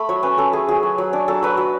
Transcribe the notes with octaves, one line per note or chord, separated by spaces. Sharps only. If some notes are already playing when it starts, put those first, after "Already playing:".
Already playing: A3 B5
F#3 C#5
C#4 B4
C#4 A4
A3 G#4
F#3 G#4
F#3
F#3
D4
F#3 A4
F#3 B4
F#3